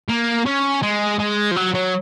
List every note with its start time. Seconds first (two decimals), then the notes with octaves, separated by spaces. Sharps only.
0.09 A#3
0.46 C#4
0.82 G#3
1.19 G#3
1.51 F3
1.56 F#3
1.74 F#3